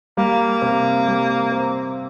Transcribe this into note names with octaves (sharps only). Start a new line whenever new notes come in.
G3 A#3
C3
G3
C4